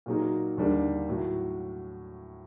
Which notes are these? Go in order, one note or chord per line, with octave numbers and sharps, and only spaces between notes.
A#2 F#3 A#3 D#4
D#2 D3 G3 A#3 D4
A2 F#3